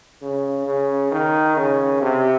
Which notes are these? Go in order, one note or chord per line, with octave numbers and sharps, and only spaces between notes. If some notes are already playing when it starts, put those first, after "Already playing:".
C#3
C#3
D#3
C#3
C3